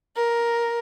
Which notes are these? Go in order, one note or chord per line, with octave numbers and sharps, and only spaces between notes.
A#4